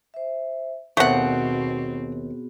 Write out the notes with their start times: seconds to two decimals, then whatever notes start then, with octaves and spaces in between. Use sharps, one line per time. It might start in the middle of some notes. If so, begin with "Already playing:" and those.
0.14 C5 E5
0.97 D#2 B2 A3 B3 C4 F#4 G#4 F#5